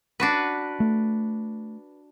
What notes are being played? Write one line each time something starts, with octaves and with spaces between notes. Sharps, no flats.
D4 F#4 B4
A3